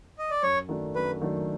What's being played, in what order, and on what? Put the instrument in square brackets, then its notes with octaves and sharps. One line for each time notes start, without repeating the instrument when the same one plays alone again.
[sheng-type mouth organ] D#5
D5
[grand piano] F#2 [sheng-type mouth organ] C#5
[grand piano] D#3 F#3 A3 D4
[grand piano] F#2 [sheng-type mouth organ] B4
[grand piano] D#3 F#3 A3 D4